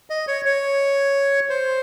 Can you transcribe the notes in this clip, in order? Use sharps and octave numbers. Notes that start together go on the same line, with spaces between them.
D#5
C#5
C#5
C5